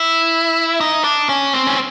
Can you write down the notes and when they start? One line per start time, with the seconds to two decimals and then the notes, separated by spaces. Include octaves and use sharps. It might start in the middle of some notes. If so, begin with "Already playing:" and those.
Already playing: E4
0.81 D#4
1.04 D4
1.29 C#4
1.53 C4
1.67 C#4